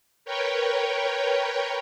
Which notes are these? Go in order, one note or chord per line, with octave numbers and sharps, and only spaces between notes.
A#4 B4 C#5 G5